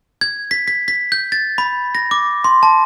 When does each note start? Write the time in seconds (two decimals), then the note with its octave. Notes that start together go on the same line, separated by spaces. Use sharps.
0.21 G#6
0.51 B6
0.68 B6
0.88 B6
1.12 G6
1.32 A6
1.58 B5
1.95 A#6
2.11 D6
2.44 C6
2.63 A5